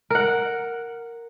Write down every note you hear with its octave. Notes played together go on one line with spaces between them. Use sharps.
A#4 F#5